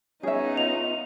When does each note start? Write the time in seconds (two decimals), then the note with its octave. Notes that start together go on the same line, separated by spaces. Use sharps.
0.23 B3 C#4 D#4 G#4 E5
0.57 F4 F7